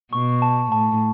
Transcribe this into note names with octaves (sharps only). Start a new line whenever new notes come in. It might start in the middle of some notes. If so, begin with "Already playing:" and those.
B2 C#6
A5
A2 A5